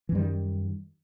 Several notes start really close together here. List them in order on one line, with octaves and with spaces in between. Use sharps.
E3 F#2 G3 D#3